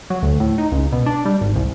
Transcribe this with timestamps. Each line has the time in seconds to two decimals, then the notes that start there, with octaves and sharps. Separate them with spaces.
0.10 F#3
0.22 D2
0.40 A2
0.58 D#4
0.72 C#2
0.92 B2
1.06 D4
1.25 G3
1.41 G#1
1.56 C2